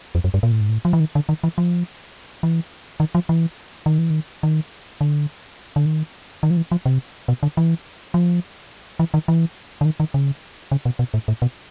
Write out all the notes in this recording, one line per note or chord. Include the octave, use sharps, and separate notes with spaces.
F2
F#2
G2
A#2
A2
G#2
A2
F3
E3
D#3
D3
D#3
E3
F3
E3
D#3
F3
E3
D#3
E3
D#3
D#3
D3
D3
D#3
D#3
F3
E3
F3
C3
B2
D3
E3
F3
E3
D#3
E3
D3
D#3
D#3
C#3
C#3
B2
B2
A2
A2
B2